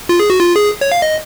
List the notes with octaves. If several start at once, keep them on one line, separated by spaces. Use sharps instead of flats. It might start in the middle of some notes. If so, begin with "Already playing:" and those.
F4
G#4
F#4
F4
G#4
C#5
F5
D#5